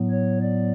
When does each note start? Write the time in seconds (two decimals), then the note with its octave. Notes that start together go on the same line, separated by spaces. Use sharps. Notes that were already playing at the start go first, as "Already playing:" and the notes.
Already playing: A2 F#3 B3
0.10 C#5
0.42 D5